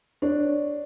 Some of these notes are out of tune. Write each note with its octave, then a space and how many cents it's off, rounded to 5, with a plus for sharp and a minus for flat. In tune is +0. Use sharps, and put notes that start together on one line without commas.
D4 +0 C#5 -5